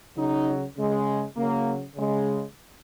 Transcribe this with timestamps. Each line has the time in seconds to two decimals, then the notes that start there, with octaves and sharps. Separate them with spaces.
0.17 C#3 F#3 D#4
0.77 C#3 G#3
1.36 C#3 F#3 A#3
1.96 C#3 G#3